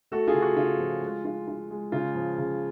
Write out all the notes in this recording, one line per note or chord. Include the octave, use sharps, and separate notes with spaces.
A3 F#4 A4
F4 G#4
C#3
F#4
C#3 F4
F3
G#3
F4
F4
G#3
C#3 F4
F3
C#3